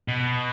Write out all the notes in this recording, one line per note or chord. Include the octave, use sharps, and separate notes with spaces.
B2